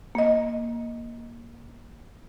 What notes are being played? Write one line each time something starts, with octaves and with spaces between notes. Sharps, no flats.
A#3 D#5